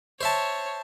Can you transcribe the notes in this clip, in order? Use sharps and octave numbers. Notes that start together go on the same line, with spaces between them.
C5 C#5 E5 A5